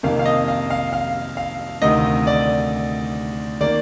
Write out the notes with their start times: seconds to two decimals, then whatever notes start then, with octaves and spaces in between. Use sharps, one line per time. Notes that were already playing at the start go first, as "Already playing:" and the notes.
0.03 F2 C3 D#3 A#3 F5
0.19 F5
0.26 D#5
0.48 F5
0.70 F5
0.93 F5
1.37 F5
1.82 D2 C3 D#3 D#5
2.27 D5
3.61 D#3 A#3 D5